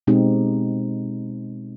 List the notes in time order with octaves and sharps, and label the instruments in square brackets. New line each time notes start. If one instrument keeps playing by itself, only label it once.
[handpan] B2 G#3 C4 D#4 G4